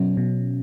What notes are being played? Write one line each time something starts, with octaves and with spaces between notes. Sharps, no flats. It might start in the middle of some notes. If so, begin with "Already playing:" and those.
Already playing: B2 F#3 C#4
B2